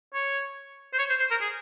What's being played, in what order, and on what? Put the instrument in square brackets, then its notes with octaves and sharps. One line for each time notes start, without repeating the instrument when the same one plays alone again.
[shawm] C#5
C5
C#5
C5
C5
A#4
G#4